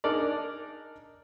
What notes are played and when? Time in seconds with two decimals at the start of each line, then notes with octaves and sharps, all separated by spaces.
0.04 D4 D#4 G#4 A#4 D5